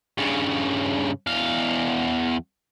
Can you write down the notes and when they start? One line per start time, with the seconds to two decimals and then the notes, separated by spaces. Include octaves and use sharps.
0.18 G2 C#3
1.27 E2 F5